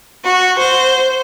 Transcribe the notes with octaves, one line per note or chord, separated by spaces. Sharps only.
F#4
C5